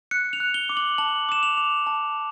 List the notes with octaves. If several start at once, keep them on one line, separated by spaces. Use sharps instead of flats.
F#6 C#7
F7
F#6
G7
D6
F#7
A5 F#7
D6 E7
F7
D6
A5